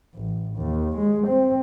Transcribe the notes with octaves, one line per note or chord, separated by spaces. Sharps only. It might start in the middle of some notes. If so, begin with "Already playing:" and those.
A1
D#2
G#3
C4